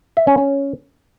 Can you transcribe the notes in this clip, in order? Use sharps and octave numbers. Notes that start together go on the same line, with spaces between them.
E5
C#4
C#4